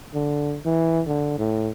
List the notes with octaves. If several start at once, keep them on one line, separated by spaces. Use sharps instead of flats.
D3
E3
D3
A2